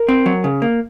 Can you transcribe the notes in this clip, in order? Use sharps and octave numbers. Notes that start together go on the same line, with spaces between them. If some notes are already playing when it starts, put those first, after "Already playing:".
Already playing: A#4
C4
F#3
C#3
A#3